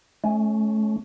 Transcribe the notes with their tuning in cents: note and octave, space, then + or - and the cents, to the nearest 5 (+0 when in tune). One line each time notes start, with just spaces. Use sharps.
A3 -35 C#4 +0